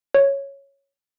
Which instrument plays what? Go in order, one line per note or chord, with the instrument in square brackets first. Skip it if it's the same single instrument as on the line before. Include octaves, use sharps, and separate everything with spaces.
[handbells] C#5